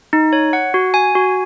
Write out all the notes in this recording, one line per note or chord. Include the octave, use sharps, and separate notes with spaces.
D#4
C#5
F#5
F#4
G#5
F#4